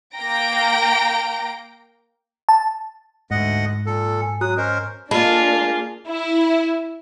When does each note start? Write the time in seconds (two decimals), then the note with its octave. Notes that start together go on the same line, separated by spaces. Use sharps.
0.15 A#3 F5 G5 A#5 A#6 D7
2.49 A5
3.31 D2 G#2 D#5 F#5
3.86 A#2 A4
4.22 G#5
4.41 F#3 F#4 A#5 D#6 F#6
4.57 C#4 A#4 C5 D#5
5.11 A#3 D4 F4 G#4 D#5 A5 B5
6.07 E4